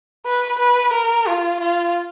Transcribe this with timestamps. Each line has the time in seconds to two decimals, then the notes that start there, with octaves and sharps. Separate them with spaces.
0.26 B4
0.59 B4
0.94 A#4
1.28 F4
1.61 F4